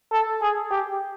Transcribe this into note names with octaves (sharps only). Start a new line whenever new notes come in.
A4
G#4
G4